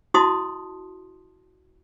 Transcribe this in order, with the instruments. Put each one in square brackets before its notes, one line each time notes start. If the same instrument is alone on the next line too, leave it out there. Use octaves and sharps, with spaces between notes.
[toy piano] E4 F#4 D#5 A5 C6 D#6